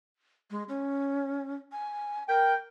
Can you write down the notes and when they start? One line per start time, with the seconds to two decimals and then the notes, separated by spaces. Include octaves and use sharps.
0.51 G#3
0.69 C#4
1.72 G#5
2.28 A#4 G5